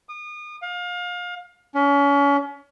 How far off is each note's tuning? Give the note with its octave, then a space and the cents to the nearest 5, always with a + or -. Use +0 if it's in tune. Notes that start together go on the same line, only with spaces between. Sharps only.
D#6 -35
F5 +30
C#4 +35